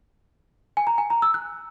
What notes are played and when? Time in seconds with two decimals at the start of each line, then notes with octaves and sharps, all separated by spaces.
0.77 G#5
0.87 A#5
0.98 G#5
1.10 A#5
1.22 E6
1.34 F#6